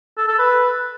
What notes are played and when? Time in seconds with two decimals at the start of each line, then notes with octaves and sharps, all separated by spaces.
0.18 A4
0.28 A4
0.39 B4